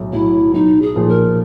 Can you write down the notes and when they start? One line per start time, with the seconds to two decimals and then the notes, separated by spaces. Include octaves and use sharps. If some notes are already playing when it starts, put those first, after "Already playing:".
Already playing: B1 A2 F#3
0.13 A2 F#3 E4
0.54 B1 D#4
0.82 G#4
0.96 A#2 F3
1.09 A#4